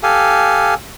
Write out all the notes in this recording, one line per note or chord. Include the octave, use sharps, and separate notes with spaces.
G4 A4 F5 G#5